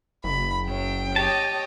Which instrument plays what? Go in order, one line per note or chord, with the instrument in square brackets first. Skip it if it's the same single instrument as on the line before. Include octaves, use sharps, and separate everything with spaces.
[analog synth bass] F#1 [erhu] B5
[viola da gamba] F#2 [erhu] G5
[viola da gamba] G4 C#5 D#5 [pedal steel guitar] A5